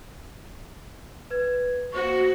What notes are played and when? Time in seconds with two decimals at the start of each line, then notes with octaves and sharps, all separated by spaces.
1.30 B4 G#6
1.93 A#3 F#4 C5 C#6